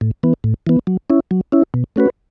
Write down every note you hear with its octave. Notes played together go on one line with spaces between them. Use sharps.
A2
E3 B3
A2
E3 B3
F#3
C#4 E4
F#3
C#4 E4
B2
A3 C#4 F#4 B4